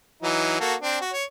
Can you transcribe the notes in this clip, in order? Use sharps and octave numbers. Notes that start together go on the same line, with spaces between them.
E3 F#3 D#4
A#3 F#4 A4
C4 D4
F#4
C#5